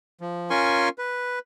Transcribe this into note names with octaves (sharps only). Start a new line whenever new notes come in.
F3
C#4 F4 A#4 G#5 C6 C#6
B4